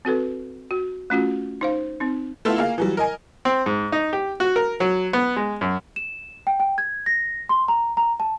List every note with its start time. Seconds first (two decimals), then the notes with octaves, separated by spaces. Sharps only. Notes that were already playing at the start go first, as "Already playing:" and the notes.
0.05 C4 F#4 A4 B4
0.71 F#4
1.10 A3 C#4 F4 F#4
1.61 D#4 C5 F5
2.00 C4 D#4
2.45 A3 B3 E4 F4 A4
2.58 A#3 G#4 F5
2.78 E3 F#3 G3
2.97 A#4 D#5 G#5
3.45 C4
3.66 G#2
3.92 D#4
4.13 G4
4.40 F#4
4.56 A#4
4.80 F#3
5.13 B3
5.36 G#3
5.61 F#2
5.96 E7
6.47 G5
6.60 G5
6.78 G#6
7.06 A#6
7.49 C6
7.68 A#5
7.97 A#5
8.20 A5